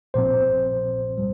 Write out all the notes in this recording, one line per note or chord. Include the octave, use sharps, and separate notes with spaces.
A#1 A#2 F3 C4 C5
G3